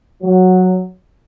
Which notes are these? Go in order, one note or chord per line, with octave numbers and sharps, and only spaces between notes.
F#3